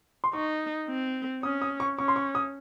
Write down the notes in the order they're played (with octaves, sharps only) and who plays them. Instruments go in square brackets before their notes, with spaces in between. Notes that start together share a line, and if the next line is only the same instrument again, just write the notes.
[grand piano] C6
[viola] D#4 [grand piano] C#6
[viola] C4
[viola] C#4 [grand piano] D#6
[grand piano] D#6
C#6
[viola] C#4 [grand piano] C#6
[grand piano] C6
C#6
D#6